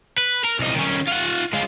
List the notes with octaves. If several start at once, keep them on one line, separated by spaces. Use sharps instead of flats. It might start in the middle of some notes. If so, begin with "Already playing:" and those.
B4
A#4
C2 D#4
D#3 C#4
F4 F#5
G#3 F4